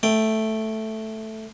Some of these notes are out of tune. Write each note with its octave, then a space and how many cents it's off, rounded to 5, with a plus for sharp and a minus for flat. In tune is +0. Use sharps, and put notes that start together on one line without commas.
A3 +0 G5 +0